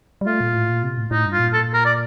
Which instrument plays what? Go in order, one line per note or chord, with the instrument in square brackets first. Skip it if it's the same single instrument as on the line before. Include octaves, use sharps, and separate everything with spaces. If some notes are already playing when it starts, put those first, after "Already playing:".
[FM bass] G3
[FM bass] A3 [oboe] F4
[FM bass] A#2
A2
A#2
C3
A2
[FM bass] A2 [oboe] D#4
[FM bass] G2
[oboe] F4
[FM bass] A#2
[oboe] A4
A#4
D5